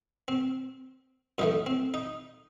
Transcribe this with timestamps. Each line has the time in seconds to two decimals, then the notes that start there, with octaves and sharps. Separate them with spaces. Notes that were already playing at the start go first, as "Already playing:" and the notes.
0.28 C4
1.38 F#2 E3 A3 D#4
1.66 C4
1.94 D#4